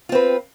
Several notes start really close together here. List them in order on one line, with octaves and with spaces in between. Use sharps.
F4 C4 B4